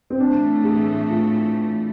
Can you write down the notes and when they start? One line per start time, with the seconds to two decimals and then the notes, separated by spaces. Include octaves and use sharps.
0.10 C4
0.19 A2 E3 A3 D4
0.64 G#4
1.10 F4